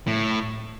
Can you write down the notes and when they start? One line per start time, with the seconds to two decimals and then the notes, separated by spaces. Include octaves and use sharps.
0.07 A2